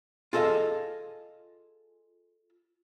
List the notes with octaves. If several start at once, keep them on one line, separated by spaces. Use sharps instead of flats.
F4 G#4 A4 D5 D#5 F5